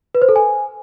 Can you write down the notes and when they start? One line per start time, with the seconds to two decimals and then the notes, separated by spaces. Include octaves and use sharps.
0.15 B4
0.22 C5
0.29 A4
0.36 G#5